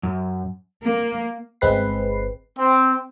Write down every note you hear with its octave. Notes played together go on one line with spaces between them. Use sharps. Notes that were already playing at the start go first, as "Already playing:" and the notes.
F#2
A#3
G1 G#3 C4 B4 C7
C4